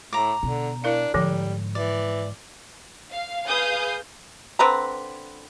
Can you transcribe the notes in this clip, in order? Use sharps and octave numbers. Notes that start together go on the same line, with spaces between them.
A2 A#5 D6
B2 D3
D4 E4 A#4 F5
G#2 D3 F3 G3
E3 D5
F5
G#4 B4 F5 D#6 G6
D3 C4 B4 A#5